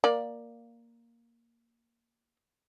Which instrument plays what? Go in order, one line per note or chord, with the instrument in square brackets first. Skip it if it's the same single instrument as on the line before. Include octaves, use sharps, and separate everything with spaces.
[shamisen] A#3 D5